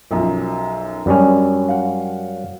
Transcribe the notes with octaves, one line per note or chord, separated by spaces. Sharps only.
B1 F#2 F3
F#2 G3 C#4 D4
F5 F#5